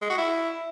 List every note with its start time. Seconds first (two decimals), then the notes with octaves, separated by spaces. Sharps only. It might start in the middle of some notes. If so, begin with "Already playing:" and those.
0.01 G#3
0.10 F#4
0.18 E4